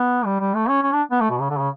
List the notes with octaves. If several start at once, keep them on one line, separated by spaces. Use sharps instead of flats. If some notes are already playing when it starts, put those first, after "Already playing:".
Already playing: B3
G3
G3
A3
C#4
C#4
D4
B3
A3
B2
C#3
D3
C#3